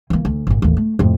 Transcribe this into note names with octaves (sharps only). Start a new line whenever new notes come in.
E3 A#3
D2
G#1 A#2
A1 D#2
A3
F2 A2